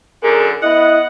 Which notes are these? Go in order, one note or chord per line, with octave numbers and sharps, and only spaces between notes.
F#2 D3 G#4 A#4
B3 E4 D#5 F#5